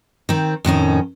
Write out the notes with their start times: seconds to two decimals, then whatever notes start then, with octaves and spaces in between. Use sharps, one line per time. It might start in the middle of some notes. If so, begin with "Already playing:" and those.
0.29 D#3 C4
0.65 F2 A2 D#3 C#4